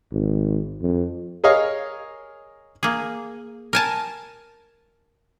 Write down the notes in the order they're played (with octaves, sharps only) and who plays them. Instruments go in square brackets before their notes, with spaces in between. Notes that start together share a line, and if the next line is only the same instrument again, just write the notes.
[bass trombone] G#1
F2
[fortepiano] G#4 A#4 C#5 D#5 F5
[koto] A#3 G#4
A#4 G#5 A5